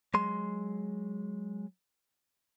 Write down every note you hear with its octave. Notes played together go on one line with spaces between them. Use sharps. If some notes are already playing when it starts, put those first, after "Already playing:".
F#3 G#3 C6